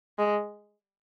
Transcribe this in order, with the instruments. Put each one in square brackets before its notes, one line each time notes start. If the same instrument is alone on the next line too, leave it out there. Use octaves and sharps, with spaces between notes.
[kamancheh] G#3